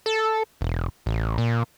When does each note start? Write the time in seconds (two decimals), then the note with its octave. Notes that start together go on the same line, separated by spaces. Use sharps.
0.06 A4
0.61 E1
1.06 A1
1.38 A#2